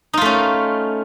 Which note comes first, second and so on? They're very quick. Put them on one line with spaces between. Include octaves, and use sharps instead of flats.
D#4 F4 A3 C#4